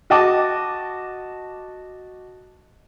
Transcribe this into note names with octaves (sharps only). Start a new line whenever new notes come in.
F#4 D#5 A5 D6